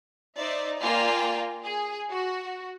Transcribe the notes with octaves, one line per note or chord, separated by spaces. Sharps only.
D#4 C5 D5 E5
A#3 F4 D5 G5 G#5
G#4
F#4